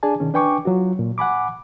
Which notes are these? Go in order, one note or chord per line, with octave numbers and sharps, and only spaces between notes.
D4 G#4 D5 G#5 A5
B2 D#3 C#4
D4 B4 G5 G#5 C#6 D6
F#3 F4 F#4
A#2
F#5 G#5 B5 D6